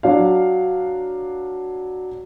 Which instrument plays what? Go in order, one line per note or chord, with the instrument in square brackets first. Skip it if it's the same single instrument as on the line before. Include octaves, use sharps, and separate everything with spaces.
[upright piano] F#3 D4 F5